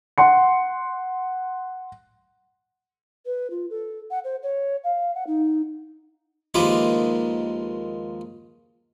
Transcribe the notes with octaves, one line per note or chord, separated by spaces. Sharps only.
F#5 C6 C#7
B4
F4
A4
F#5
C5
C#5
F5
F#5
D#4
D#2 F3 G#3 D#4 B4 D6